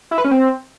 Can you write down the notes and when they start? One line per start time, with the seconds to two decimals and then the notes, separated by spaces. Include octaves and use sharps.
0.11 E4
0.18 B4
0.25 C#4
0.31 C4